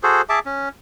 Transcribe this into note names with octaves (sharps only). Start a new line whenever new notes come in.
F#4 G#4 A4 C5
G#4 E5 A5 D6
C#4